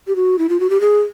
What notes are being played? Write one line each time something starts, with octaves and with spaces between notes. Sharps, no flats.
G4
F#4
E4
F4
F#4
G4
G#4